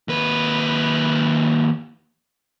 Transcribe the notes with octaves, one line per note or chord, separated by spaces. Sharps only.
D#2 B4